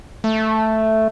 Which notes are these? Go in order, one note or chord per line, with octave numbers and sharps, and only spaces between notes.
A3